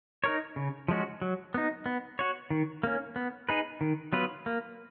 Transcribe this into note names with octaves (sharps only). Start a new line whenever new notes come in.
D#4 A#4 C#5
C#3
F3 G#3 C#4 F#4
F#3
B3 D#4
B3
F#4 C#5
D#3
A#3 C#4
B3
D#4 G#4 B4
D#3
F#3 B3 F4 B4
A#3